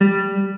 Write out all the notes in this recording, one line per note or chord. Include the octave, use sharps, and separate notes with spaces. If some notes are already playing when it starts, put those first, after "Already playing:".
G3